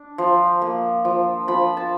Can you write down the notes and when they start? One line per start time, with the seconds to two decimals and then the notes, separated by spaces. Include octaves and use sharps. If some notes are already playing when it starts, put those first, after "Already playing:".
Already playing: D4
0.18 F3
0.62 A#3
1.05 F3
1.48 F3 B5
1.77 A5